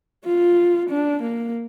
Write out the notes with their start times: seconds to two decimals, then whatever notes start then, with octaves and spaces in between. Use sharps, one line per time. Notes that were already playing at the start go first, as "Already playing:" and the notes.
0.25 F4
0.90 D4
1.23 A#3